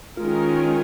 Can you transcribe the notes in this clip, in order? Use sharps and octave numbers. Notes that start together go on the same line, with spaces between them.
D#3 G#3 C#4 F4 A#4